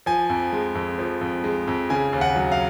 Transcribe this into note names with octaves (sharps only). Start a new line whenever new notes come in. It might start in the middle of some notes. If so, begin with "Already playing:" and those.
F3 G#5
F2
G#3
F2
F3
F2
G#3
F2
C#3 G#5
D#2
F#5
F#3
F5